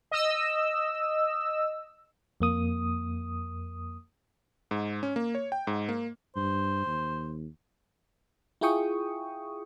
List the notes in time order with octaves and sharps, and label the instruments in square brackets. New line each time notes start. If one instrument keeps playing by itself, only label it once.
[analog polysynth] D#5 E6
[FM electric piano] F2 A#3 D#6
[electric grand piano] G#2
C#4
A#3
C#5
G5
G#2
A#3
[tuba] G2 [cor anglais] C5
[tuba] D#2
[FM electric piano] E4 F4 G#4 G5 C#6 D#6